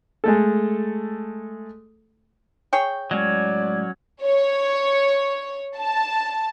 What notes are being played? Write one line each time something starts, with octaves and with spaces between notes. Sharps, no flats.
G#3 A3 A4
G#4 C#5 G5
A2 F#3 G#3 C#4 D5 D#5
C#5
A5